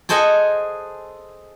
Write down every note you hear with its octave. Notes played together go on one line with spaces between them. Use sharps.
G#4 A4 C5 D#5 F#5 G#5